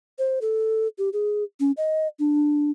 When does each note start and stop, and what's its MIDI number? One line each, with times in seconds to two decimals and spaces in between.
0.19 0.39 72
0.41 0.87 69
0.98 1.09 67
1.13 1.44 68
1.60 1.72 61
1.77 2.08 75
2.19 2.71 62